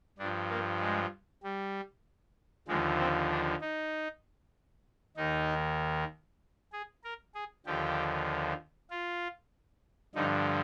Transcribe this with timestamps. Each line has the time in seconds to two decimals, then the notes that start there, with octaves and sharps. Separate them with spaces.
0.18 G2 F3 D4
0.50 A#3
0.81 G#3
1.43 G3
2.68 D#2 D3 F3 G#3
2.99 C4
3.30 D4
3.61 D#4
5.16 D#2 D#3 D#4
6.73 G#4
7.04 A#4
7.35 G#4
7.66 D#2 D3 F3 G4
8.91 F4
10.15 G2 D3 F3 D#4